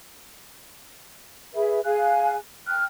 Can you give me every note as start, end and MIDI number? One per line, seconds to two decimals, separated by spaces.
1.54 1.80 68
1.54 1.80 71
1.54 1.80 76
1.84 2.35 68
1.84 2.35 77
1.84 2.35 80
1.84 2.35 90
2.67 2.84 79
2.67 2.84 89
2.67 2.84 90